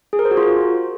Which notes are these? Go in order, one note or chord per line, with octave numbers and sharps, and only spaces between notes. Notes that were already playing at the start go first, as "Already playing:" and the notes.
G#4
A#4
C5
F#4
F4